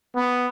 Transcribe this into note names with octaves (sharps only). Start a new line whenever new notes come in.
B3